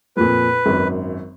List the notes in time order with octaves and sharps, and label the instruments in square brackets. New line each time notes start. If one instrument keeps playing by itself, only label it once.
[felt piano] F2 A#2 [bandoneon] B4
[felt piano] G#1 F#2